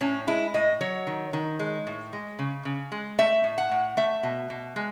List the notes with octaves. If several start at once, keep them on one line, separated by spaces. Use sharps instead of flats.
A2 C#4
G#3 E4
A2 D#5
F#3 C#5
D#3
D#3
G#3
A2
G#3
C#3
C#3
G#3
A3 E5
A2
F#5
A2
A3 E5
B2
B2
G#3